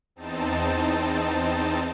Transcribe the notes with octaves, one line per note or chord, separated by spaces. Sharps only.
E2 C4 D#4 A5